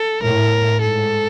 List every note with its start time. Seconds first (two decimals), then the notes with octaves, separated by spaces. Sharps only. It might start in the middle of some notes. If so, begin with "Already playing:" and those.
Already playing: A4
0.22 A2 A#4
0.81 G#2 A4